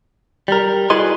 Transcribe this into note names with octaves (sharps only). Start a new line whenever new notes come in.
G3 A#4
E4 F#4 G#4 B4 D#5 C6